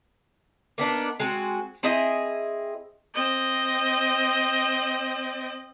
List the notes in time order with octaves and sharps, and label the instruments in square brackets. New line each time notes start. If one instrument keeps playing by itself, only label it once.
[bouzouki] A#3 B3 D4 D#4
G#3 C4 F#4 G#5
C4 E4 G#4 D#5
[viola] C4 D#5